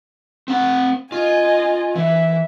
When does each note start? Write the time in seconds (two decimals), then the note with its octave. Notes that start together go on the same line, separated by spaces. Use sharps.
0.48 C4 F#5
1.12 F4 D#5 G#5
1.96 E3 E5